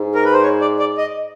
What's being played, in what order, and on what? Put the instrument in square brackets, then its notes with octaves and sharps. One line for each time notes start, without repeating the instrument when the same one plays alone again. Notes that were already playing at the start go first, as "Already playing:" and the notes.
Already playing: [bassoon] G#2
[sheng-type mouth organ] A#4
B4
C5
C#5
D5
D5
D#5